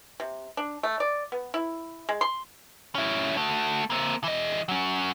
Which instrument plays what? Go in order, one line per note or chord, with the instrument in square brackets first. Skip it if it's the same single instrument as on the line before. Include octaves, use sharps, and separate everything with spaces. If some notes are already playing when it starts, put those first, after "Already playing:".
[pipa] C3
D4
A3
D5
B3
E4
G#3
C6
[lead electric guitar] C#4 E4
A3 F#4
A#3 C4
E3 D#5
F#3 C#4